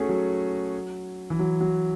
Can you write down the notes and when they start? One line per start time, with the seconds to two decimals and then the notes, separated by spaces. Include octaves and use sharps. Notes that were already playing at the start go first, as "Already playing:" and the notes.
Already playing: A3 C#4 F#4 G#4
0.09 F#3
1.30 E3
1.39 F#3
1.61 F#3